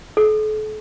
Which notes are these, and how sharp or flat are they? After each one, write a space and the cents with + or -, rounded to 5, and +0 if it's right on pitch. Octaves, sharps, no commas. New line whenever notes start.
A4 -40